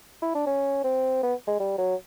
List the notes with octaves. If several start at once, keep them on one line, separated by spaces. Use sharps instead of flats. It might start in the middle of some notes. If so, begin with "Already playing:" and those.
E4
D4
C#4
C4
B3
G#3
G3
F#3